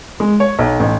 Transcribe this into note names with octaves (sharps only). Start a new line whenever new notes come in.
G#3
C#5
B1
A1